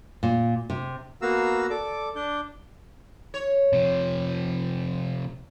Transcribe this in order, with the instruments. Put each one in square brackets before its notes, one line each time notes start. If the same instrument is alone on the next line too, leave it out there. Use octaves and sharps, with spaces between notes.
[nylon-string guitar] A#2
C3
[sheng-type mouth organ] A#3 B3 F#4 F5 A#5 E6
A4 D5 D6
D4 D5 G6
[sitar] C#5
[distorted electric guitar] C3 F3